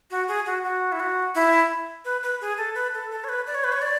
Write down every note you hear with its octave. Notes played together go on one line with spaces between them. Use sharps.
F#4
G#4
F#4
F#4
E4
F#4
E4
B4
B4
G#4
A4
B4
A4
A4
C#5
B4
D5
C#5
B4
C#5
D5